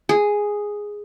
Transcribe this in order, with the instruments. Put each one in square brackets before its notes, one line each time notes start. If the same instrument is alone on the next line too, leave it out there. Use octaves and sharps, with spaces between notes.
[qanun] G#4